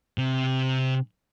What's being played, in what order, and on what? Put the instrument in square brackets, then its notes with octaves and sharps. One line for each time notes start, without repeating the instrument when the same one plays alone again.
[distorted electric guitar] C3